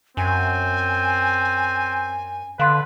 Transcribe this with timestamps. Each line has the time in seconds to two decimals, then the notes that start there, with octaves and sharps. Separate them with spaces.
0.17 F#2 C4 G#5
2.59 D3 B4 F5 C6 F#6